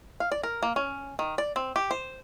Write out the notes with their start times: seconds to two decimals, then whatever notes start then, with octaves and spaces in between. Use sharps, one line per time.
0.20 F5
0.32 D5
0.43 A#4
0.63 A#3
0.76 C#4
1.19 D#3
1.38 D5
1.56 C4
1.76 G4
1.91 C5